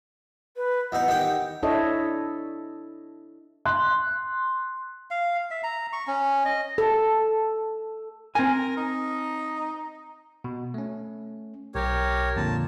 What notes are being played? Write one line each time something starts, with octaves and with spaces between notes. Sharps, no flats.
B4
E2 D#4 F#5
D#3 G4
D4 E4 A4 C#5 D#5 E5
C6 F#6
F5
E5
A#5
C#6
C#4
D#5
A4
C4 A#4 G#5
D#4
B2
A3 C#4
B1 G4 A#4 C#5
F2 A#2 D3 A5